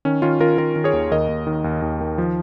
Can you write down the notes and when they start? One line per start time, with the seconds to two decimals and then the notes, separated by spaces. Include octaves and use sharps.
0.05 D#3 C#4
0.22 D#3 C#4 F4
0.40 D#3 F4 A#4
0.58 D#3 F4 A#4
0.76 D#3
0.84 G#4 C#5
0.93 D#2
1.11 D#2 A#4 D#5
1.29 D#2
1.47 D#3
1.64 D#2
1.82 D#2
2.01 D#3
2.18 F3